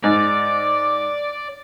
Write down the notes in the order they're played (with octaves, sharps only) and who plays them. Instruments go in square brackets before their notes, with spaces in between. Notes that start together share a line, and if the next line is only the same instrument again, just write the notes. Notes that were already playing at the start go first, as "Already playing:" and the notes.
[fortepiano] G#2 [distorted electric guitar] D5 [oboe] D6